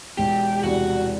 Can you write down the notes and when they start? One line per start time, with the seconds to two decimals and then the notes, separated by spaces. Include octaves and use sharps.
0.17 E1 G4
0.64 E2 C3 G3 F#4